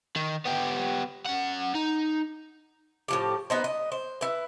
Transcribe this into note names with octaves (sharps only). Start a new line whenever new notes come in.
D#3
B3 G4
C#4 F#5
D#4
A2 F3 G4
B3 D#4 C5
D#5
C5
E4 B4